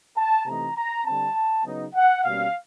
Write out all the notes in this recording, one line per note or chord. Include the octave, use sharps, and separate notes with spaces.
A5
C3 E3 A3 C4 D#4 A#5
A#5
D3 G3 C4 A5
C#3 F#3 B3 D#4
F#5
B2 G3 A#3 C#4 F5